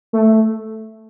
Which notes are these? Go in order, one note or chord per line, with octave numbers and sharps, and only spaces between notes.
A3